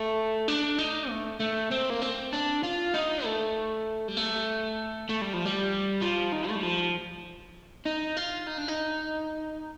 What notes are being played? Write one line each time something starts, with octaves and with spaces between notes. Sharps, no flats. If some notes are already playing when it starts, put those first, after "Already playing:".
Already playing: A3
D4
D#4
A3
A3
C4
A#3
C4
D4
F4
D#4
A3
G3
A3
A3
G3
F3
G3
F3
D#3
A3
G3
F3
D#4
F4
D#4
D4
D#4